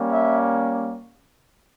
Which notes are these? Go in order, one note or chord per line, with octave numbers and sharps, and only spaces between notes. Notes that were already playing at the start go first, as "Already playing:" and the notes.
Already playing: G3 A#3 C#4
E5